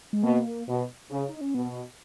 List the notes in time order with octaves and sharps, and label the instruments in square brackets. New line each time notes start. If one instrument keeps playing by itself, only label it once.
[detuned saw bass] G#3
[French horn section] B2 [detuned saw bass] A#3
[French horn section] B2
C#3
[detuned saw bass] D#4
C#4
[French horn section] B2 [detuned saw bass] B3